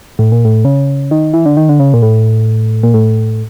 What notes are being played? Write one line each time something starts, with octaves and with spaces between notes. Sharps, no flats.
A2
A#2
A2
C#3
D#3
E3
D3
D#3
D3
C#3
A#2
A2
A#2
A2